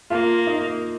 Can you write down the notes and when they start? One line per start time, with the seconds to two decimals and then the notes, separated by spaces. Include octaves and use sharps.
0.10 A#3 F4
0.47 D#4